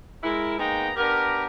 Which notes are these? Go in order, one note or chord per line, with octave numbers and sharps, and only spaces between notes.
G#3 E4 A#4
G#3 A#3 B3 D#4 G5 A#5
B3 D4 G4 A#4